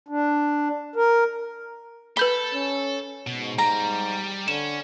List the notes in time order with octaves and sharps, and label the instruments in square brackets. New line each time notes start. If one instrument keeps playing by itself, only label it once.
[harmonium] D4
A#4
[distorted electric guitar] A4 [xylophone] B4 G6 G7 [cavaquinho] B5
[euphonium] C#4
[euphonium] G#2 [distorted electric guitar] B2
[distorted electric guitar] G3 [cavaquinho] A#5
[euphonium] D3 [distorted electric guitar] C#4 [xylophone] E7